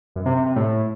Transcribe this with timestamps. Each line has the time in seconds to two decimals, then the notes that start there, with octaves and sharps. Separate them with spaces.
0.16 F#2
0.26 C3
0.36 C3
0.46 C3
0.56 A2